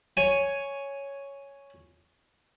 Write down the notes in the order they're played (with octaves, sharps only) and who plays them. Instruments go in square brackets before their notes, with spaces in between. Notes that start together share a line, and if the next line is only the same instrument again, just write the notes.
[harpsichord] C#5 G#5